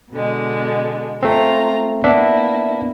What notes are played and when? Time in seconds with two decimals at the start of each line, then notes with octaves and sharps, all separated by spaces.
0.12 B2 D3 G#3
1.23 A3 C4 F4 A#5
2.04 A#3 B3 D4 E4 E5